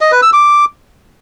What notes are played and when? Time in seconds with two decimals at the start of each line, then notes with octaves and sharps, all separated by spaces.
0.01 D#5
0.12 B4
0.22 E6
0.33 D6